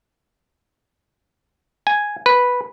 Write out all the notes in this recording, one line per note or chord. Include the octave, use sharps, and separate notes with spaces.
G#5
B4